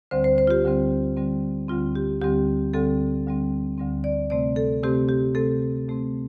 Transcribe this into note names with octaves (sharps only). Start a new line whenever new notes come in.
D2 D3 G3 C4 C5
C5
C5
F4
G4
D2 D3 G3 C4
D2 D3 G3 C4
D2 D3 G3 C4 F4
G4
D2 D3 G3 C4 G4
D2 D3 G3 C4 A4
D2 D3 G3 C4
D2 D3 G3 C4
D5
C3 A3 C4 D5
A4
C3 A3 C4 G4
G4
C3 A3 C4 A4
C3 A3 C4